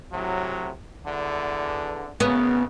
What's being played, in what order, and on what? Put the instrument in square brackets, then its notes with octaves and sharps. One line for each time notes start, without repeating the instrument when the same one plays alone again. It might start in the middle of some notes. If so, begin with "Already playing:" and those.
[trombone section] A2 C3 F#3
E2 D3
[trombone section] G#1 F#2 C#3 [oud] B3